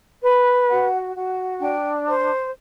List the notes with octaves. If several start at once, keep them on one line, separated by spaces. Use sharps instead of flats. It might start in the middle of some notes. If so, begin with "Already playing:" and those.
B4
F#4 F#5
F#4
D4 G5
C5